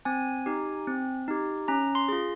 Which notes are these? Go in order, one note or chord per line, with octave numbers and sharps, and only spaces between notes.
C4 G#5
D#4 G4
C4
D#4 G4
C#4 A#5
C6
F4 G#4